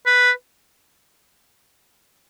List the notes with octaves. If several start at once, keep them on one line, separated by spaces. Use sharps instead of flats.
B4